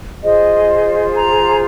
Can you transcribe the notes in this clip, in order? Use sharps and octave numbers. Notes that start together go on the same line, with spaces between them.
F4 G#4 C5 D#5
A#5